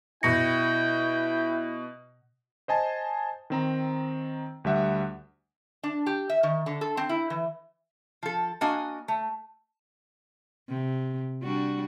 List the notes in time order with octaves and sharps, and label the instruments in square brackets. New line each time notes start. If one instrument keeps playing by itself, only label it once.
[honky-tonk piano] B2 C#7 [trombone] E4 [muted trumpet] G5 [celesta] A#6
[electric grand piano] C5 D#5 G#5 A5
D#3 C4 A#5
D2 G3 E5 F#5
[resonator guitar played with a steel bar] D4
G4
E5
D#3
D3
A4
C4
E4
E3
F3 A4
A#3 D4 F#4 D#5 G#5
A3
[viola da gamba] C3
G3 D4 F#4